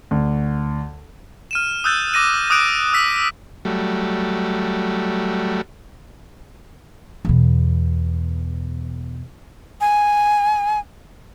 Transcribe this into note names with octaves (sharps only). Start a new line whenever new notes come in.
D2
F6 D#7 E7
D#6 E6 F#6 G6 A6
D6 A#6 D#7
D6 D#6 F#6 G6 D7 E7
E6 F#6 B6
F#3 G3 A3
E2 B2
G#5